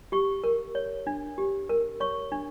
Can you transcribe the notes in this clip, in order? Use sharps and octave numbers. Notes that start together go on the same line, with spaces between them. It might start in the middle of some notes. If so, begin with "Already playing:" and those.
G4 C#6
A#4
C#5
D4
G4
A#4
C#5 C#6
D4